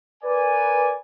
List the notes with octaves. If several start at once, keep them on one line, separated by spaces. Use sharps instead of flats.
A#4 B4 D5 G#5